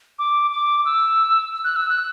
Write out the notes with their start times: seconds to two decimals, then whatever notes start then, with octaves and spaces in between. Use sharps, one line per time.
0.19 D6
0.51 D6
0.85 E6
1.64 F#6
1.76 E6
1.90 F#6